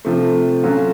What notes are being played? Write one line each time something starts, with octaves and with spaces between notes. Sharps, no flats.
C3 F3 A3
F#3 A3 C#4 F4